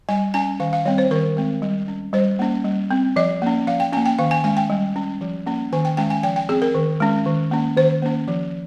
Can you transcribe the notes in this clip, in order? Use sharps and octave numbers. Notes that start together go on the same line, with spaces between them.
G3 G#5
C#4 G#5
D#3 F5
F5
G3 C4 C#5
C5
D#3 A#4
G#3 C4
G3
C#4
G3 C5
A#3 C#4
G3
C4
F3 D#5
A#3 C#4
F3 F5
G5
A#3 C#4 G#5
G5
D#3 F5
G#5
G#3 C#4 G#5
G5
G3
C#4
F3
A#3 C#4
D#3 G#5
G5
G#3 C#4 G5
G#5
F3 G5
G5
C4 G#4
A#4
D#3
G#3 C#4
D#3
A#3 C#4
D#3 C5
A#3 C#4
F3